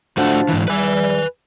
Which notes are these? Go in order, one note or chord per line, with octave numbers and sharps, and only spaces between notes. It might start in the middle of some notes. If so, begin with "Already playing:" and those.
A2 F3 A3 D4 F#4
G#2 E3
E2 G3 B4 G#5